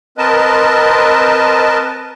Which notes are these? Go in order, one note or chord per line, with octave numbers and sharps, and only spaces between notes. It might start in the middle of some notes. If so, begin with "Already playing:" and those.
C4 A#4 B4 D#5 A5